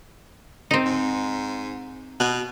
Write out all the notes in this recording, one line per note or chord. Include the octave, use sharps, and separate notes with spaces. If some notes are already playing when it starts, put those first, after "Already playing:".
C4 D#4
G#2
B2